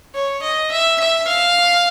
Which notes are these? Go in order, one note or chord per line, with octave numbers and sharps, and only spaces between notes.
C#5
D#5
E5
E5
F5